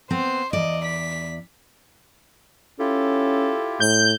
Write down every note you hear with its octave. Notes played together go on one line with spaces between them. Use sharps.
B3 C4 C5
E2 D5 D#5
B6
C#4 E4 F4 G4 A4
A2 G6